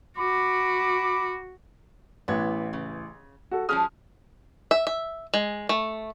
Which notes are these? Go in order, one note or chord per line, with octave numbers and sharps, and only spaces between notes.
F#4 B5 D6
A1 E3 B3 G#6
C#3
F#4 A4
F3 C#4 G#4 D#6 F6
E5
E5
G#3
A3